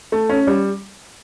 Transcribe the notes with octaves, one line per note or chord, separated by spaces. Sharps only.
A3
C#4
G3